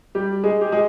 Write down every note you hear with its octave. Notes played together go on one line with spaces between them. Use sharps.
G3 G4
G#3 G#4
G4
G#3 G#4